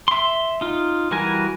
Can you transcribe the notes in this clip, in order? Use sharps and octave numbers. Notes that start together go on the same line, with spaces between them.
E5 C6
D#4 F4
E3 G3 F#4 A#4 G#5